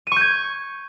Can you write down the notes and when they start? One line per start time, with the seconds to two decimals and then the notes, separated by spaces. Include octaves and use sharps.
0.07 D#7
0.12 C#6
0.16 G6
0.21 G#6